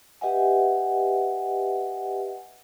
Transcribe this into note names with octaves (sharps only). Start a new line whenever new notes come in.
G4 B4 D#5 E5 F#5 G#5